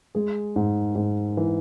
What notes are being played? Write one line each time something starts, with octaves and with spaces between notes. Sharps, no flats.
G#3 G#4
G#2
G#2
E3